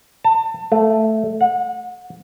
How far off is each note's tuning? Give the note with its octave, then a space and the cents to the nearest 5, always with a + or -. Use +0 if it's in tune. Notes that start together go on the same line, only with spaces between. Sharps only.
A5 +30
A3 +0
F#5 -30